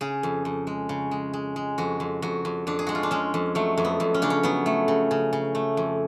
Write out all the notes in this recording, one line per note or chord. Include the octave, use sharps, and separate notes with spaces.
C#3 G#4
F2
F2
G#3
C#3
G#3
G#3
G#3
F2 F#4
F2
F2 F#4
F2
F2 D4
G#4
G#3 F#4
F4
D4
G#3 C#4
F2
F#3 A3
F2
B3
F2
C#4
C#3 D4
C#4
F#3 B3
A3
C#3
C#3
C#3
A3
F2